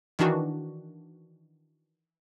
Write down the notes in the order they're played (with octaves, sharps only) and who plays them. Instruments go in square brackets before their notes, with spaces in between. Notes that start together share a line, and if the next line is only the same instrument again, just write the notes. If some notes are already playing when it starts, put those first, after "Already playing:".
[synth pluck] D#3 E3 D4 F#4